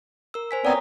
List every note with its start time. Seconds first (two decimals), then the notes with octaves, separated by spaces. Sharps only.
0.34 A#4 E6
0.51 C5 G#5 B6
0.65 B3 C4 C#5 D5 G#5 A#5 D#6